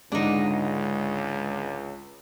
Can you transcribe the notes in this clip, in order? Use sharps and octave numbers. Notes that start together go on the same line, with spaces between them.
C#2 G#2 D3 D4 D#4